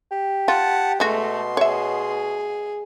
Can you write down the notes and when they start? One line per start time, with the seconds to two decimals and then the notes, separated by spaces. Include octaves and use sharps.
0.11 G4
0.48 F4 F#5 A5
1.00 B2 G#3 A3 F#4 C6
1.57 G#4 C#5 E5